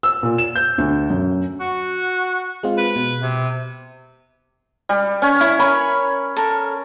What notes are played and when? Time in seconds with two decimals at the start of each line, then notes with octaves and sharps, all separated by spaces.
0.03 E6
0.23 A#2
0.38 E7
0.56 G6
0.78 D2
1.10 F#2
1.60 F#4
2.63 G#3 C4 F4
2.78 B4
2.96 B2
3.22 C3
4.89 G3
5.22 C#4 G#5 C#6
5.41 E4 C#5
5.59 A#4 C#5 G#5 B5
6.37 A4 A#4